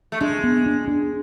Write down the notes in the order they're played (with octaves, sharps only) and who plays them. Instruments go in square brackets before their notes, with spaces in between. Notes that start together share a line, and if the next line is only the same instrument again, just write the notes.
[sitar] A3
[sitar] G#3 [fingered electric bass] D4
[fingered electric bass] B3
D4
D4